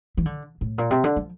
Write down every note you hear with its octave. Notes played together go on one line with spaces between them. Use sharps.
E3
D3
A2
A#2
C3
D3
F3